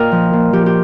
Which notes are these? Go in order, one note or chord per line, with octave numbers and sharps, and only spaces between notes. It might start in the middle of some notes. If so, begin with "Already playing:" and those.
Already playing: A#2 A#4 D#5 F5 G5
F3
A#2
F3 G4
G4